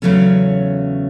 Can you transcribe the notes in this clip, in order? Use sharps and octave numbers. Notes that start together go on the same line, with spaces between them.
E2 C#3 F#3 A3 C#4